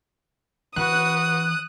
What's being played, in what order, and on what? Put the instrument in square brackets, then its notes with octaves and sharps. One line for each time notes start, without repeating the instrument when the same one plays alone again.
[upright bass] E3 [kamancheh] F#4 B4 [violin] D#6 [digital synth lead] F#6